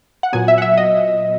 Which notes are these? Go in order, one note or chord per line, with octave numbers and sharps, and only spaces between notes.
F#5
A#2 F#3 B3 G#5
E5
F#5
E5
D#5